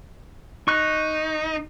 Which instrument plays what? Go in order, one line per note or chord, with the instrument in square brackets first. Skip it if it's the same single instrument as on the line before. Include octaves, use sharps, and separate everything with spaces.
[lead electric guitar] D#4 [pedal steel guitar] C#6 F#6